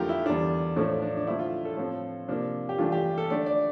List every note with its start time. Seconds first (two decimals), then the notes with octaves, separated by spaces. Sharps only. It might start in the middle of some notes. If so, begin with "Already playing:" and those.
Already playing: F2 D3 A3 F4 G4 A#4
0.09 E4
0.26 E2 D3 G3 D4
0.76 A2 F3 A3 D4
1.02 D4
1.17 D4
1.27 D3 F3 A3 E4
1.39 F4
1.65 A4
1.77 A2 F3 C4
2.28 C3 F3 A#3 D4
2.69 G4
2.78 G2 E3 A3 D4 F4
2.92 G4
3.18 A4
3.30 D3 A3 D4 D5
3.46 D5